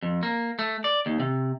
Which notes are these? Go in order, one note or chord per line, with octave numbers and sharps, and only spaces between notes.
F2
A#3
A3
D5
D#2
C3